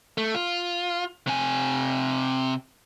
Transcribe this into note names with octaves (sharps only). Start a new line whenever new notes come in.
A3
F4
C3 G#5